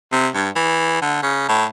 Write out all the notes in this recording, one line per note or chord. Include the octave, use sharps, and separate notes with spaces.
C3
G2
E3
D3
C#3
A2